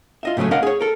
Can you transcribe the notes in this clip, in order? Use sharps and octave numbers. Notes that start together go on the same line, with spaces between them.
F4 D#5 E5
A2 C#3 F#3 A3 C#4
C#4 A#4 D#5 F5 F#5
G#4 C#5
A4 A#4